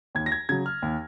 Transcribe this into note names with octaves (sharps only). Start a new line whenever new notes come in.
D#2 G#6
A#6
G#6
C#3 F#3 G#6
F6
D#2